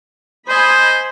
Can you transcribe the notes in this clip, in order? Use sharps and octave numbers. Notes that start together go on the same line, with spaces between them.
C5 D#5 G#5 B5